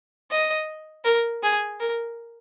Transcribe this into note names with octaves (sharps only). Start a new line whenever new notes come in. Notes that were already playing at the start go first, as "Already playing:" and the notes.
D#5
A#4
G#4
A#4